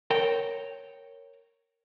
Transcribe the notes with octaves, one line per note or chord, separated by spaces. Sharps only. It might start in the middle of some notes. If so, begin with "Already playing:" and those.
A#4 C#5 G5